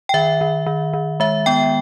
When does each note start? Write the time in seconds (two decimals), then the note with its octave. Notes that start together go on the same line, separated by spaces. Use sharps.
0.09 G5
0.14 D#3 E5
0.41 D#3
0.66 D#3
0.93 D#3
1.20 G#3 E5
1.46 B3 G5